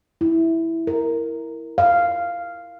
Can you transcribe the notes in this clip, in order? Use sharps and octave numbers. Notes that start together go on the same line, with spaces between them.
E4
A#4
F5